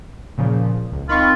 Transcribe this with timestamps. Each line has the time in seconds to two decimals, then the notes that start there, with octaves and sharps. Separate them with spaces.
0.38 A#2 C#3 F3
0.92 C#2
1.09 D#3 C4 F4 B5 C#6